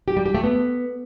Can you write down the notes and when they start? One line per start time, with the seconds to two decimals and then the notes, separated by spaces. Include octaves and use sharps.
0.08 G4
0.17 G3
0.26 G4
0.35 A3
0.44 B3